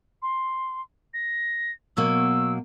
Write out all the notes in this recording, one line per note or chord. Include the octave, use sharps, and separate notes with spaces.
C6
A#6
B2 F#3 A#3 E6